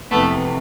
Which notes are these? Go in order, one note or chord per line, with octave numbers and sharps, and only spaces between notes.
F2 C3 E3 A3 B3